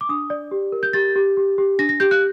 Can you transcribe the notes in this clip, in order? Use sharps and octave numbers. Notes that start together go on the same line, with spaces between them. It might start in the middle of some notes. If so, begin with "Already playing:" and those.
D6
D4 D#6
D5
G4
A#4
G6
G4 A6
G4
G4
G4
D4 A#6
A#6
G4 G6
F#6